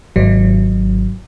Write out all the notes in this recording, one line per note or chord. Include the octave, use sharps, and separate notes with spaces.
G#1 F#3